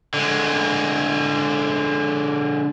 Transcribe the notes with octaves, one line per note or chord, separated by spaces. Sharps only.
D3 G#3